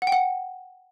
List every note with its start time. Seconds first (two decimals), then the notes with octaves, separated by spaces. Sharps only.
0.02 F#5
0.07 G5
0.12 F#5